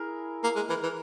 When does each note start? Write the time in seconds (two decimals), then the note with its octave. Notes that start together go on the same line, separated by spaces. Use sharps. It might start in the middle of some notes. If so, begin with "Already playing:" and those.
Already playing: E4 G#4 A#4
0.44 A#3
0.56 G#3
0.69 E3 A#4
0.83 E3